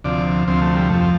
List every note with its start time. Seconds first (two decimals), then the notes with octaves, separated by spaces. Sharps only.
0.04 D2 C3 F3 D5
0.48 D2 C3 F3 C4
0.61 A3
0.76 G3
0.90 F2 F3 A3
1.01 C4